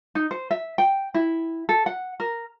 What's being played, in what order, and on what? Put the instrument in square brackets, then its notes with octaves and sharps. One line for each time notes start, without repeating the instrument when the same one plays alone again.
[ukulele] D#4
C5
E5
G5
E4
A4
F#5
A#4